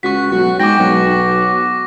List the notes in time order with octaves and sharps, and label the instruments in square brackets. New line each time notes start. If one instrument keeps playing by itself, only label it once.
[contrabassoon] C#2 [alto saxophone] F#4 [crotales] C#6 B6
[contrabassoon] B1 [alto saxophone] F#4
[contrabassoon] G#2 [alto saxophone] G5 [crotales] D6 A#6
[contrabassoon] B1 [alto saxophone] F#4